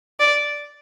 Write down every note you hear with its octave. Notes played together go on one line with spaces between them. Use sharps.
D5